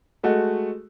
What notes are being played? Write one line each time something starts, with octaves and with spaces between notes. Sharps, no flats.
G#3 A3 F#4